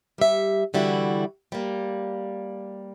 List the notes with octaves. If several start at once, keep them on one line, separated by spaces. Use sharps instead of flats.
G3 E5
D3 E3 G3 E4 F#4
G3 A#3